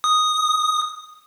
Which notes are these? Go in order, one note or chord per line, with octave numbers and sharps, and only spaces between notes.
D#6